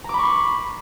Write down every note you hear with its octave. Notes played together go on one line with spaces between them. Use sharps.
A#5 B5 C#6 D6 C7